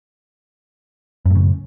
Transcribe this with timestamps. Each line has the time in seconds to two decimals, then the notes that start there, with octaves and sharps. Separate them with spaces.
1.25 F#2
1.30 A2
1.35 C#3